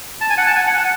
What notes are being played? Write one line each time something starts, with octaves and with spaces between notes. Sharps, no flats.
A5
G#5
F#5
A5
G#5
F#5
F#5